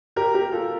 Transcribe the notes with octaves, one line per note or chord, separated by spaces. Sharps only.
G4 A#4
G4 A#4
F4 A4